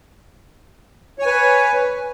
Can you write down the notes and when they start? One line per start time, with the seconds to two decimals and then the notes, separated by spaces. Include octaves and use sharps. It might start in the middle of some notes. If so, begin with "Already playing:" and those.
1.19 C#5
1.22 G#5
1.26 B4